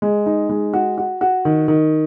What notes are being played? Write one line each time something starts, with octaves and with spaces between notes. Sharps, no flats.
G#3
D#4
G#3
F#4
F#4
F#4
D#3
D#3